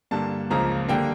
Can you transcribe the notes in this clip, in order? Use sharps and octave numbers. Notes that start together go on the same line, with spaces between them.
G2 D3 G3 A#3 A5
C#2 C#3 F3 A#3 A#5
D3 G3 A#3 G5